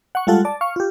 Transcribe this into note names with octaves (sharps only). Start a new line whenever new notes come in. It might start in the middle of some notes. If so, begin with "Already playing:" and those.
F#5 C#6
G3 G#3 F4 A4 F#5
D5 A5
F5 C#6
F4 G4